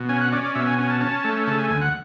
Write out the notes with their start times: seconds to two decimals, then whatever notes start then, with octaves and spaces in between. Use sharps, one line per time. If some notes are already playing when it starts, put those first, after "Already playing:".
Already playing: B2
0.09 C#4 G#5
0.21 F#5
0.32 C#4 D5
0.44 D5
0.55 B2 E5
0.67 G#5
0.78 C#4 G#5
0.90 A5
1.01 C#4 A5
1.24 A3
1.47 C#3 A5
1.59 G#5
1.70 D2 G#5
1.81 F#5